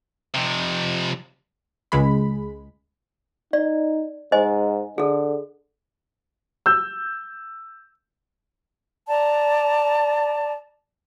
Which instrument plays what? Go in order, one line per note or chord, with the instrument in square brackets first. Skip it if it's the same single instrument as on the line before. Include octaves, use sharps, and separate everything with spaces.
[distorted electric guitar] F2 C3
[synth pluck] C#2 G#3 B5
[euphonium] D#4 [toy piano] D5
[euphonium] G#2 [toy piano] C5 D#5 G#5
[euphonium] D3 [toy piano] G#4 A4
[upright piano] E6 G6
[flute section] D5 A5 A#5